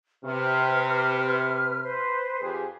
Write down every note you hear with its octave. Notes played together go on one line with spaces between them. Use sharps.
C3 B4 F6
B4 C5
F2 G4 G#4